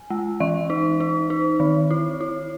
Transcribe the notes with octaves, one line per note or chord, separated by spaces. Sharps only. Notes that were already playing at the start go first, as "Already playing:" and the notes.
Already playing: G#5
G#3
E3 E5
D#4
D#4
D#4
D#3
E4
E4